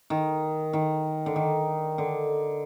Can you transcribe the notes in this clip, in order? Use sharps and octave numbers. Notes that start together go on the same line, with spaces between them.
D#3
D#3
D3
D#3
D3